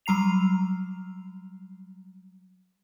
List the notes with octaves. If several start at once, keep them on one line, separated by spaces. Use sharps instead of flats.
F#3 G3 A#5 C7 F7